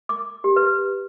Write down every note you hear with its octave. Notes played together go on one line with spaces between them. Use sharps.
D6
G4
B4